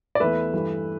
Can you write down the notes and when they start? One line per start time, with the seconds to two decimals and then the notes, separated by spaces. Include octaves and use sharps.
0.15 D5
0.20 E2 E3 A3 B4 E5
0.54 G2 E3 A3